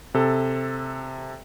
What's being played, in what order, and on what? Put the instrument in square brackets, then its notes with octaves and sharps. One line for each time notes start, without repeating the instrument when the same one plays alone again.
[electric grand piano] C3 A4